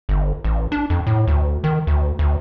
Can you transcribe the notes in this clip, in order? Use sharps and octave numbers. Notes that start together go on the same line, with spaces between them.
G1
A1
D4
F2
A2
D2
D#3
D2
D2